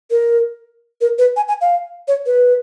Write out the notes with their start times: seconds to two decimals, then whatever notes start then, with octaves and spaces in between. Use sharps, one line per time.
0.11 A#4
1.01 A#4
1.18 B4
1.37 G#5
1.48 G#5
1.61 F5
2.08 C#5
2.26 B4